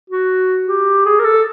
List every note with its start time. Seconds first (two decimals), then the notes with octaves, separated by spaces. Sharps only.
0.10 F#4
0.68 G4
1.05 G#4
1.20 A#4
1.25 A4